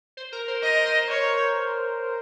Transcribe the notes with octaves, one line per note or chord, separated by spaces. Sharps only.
C5
A#4
C5
A#4 D#5
C5
C#5